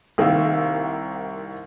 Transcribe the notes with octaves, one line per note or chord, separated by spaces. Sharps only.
C2 D#3 A#3 F5 E6